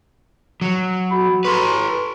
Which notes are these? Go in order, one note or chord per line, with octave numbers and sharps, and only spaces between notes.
F#3
F#4 B5
A4 B4 C6 C#6